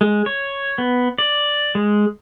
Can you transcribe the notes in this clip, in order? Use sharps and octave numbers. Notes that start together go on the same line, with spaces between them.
G#3
C#5
B3
D5
G#3